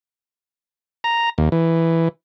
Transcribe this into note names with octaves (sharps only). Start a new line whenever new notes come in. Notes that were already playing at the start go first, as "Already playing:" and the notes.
A#5
D#2
E3